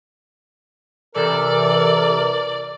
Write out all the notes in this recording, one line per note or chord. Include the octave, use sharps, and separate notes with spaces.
C3 E3 A4 A#4 D5